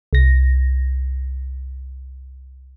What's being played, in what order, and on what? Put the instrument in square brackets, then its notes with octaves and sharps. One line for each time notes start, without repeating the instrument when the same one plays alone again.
[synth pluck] C2 A#6